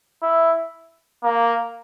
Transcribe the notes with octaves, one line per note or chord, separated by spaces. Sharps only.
E4
A#3